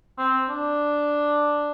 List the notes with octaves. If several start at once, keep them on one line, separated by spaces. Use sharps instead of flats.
C4
D4